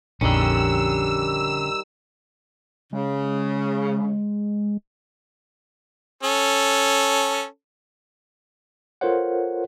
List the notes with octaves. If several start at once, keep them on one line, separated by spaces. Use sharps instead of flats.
A#1 F2 D3 D#3 G3 C#4 A#4 E6
C#3 G#3
C#4 A4
F4 A4 A#4 C5 C#5 F#5